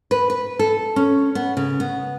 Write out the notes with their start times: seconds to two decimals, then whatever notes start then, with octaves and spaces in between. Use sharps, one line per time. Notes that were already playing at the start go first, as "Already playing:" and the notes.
0.11 B4
0.30 B4
0.59 A4
0.96 C#4
1.35 B3
1.57 C#3
1.80 B3